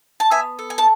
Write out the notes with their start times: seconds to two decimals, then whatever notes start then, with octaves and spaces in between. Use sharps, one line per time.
0.20 A5
0.31 B3 E5 G#5
0.59 A4
0.70 G#5
0.78 A5